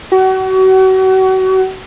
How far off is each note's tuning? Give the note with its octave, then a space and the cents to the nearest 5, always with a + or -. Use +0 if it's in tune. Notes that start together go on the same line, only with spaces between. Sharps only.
F#4 +35